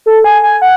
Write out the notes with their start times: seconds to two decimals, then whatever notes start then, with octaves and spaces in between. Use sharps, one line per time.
0.06 A4
0.24 G#5
0.43 G#5
0.62 F#5